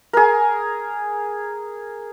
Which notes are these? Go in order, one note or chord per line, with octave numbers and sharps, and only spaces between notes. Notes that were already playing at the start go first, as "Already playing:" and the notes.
G#4 A#4